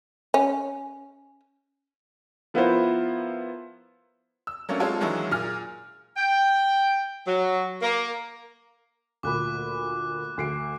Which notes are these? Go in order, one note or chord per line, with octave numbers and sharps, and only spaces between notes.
C#4
F3 B3 E4 F4 A#4 C5
E6
F#3 A3 A#3 C#4 D4
G#3 C4 F4 A4 C#5
D#3 E3 F#3 G#3 D4 E4
A#2 G#4 F6
G5
F#3
A#3
D2 A#2 B5 D6 F#6
D2 C7 D7